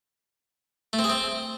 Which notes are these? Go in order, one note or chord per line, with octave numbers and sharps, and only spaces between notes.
A3
C4
G#4
C4